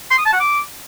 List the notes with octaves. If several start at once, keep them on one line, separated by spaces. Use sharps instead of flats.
C6
D#6
A5
F#5
D6